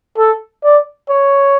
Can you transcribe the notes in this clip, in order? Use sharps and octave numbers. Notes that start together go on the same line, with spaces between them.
A4
D5
C#5